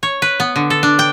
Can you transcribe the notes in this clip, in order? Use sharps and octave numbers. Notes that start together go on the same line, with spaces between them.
C#5
B4
B3
D3
A4
D4
G5